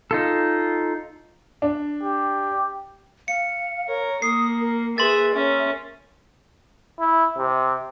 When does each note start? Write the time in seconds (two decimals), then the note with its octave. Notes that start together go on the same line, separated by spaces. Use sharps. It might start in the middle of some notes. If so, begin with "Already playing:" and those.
0.11 D#4 F4 A4
1.62 D4
2.03 G4
3.28 F5 C#7
3.88 A#4 C#5
4.22 A#3 D#6 C7
4.61 A#4
4.98 G#4 B4 E5 C6 A6
5.34 C#4 A#4 E5
6.99 E4
7.38 C3